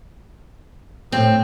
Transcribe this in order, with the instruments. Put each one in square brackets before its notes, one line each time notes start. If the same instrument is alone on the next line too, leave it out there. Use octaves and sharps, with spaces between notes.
[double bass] A2 [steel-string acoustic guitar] C4